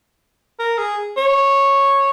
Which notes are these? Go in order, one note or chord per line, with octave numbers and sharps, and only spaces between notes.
A#4
G#4
C#5